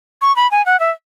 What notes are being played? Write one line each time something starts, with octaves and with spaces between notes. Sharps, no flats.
C#6
B5
G#5
F#5
E5